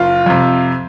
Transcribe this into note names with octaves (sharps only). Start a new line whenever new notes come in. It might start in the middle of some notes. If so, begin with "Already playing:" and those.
Already playing: F#1 F4
F2 C3